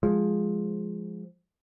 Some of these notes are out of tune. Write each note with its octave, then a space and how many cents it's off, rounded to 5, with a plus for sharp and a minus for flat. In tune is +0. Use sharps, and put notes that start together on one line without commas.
F3 +5 G#3 +0